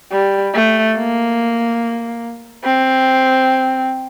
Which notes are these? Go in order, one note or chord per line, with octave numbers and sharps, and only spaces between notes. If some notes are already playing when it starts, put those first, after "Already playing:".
G3
A3
A#3
C4